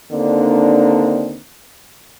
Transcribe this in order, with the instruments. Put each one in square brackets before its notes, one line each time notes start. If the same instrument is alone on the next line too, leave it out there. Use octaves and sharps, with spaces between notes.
[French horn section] D#2 D3 A#3 C4 D4 D#4